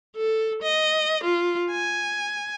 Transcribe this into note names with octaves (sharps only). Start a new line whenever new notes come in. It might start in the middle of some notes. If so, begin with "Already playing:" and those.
A4
D#5
F4
G#5